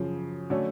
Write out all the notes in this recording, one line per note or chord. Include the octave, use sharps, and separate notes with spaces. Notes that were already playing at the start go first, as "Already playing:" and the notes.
Already playing: F#2 C#3 F3
D3 F#3 A3 C#4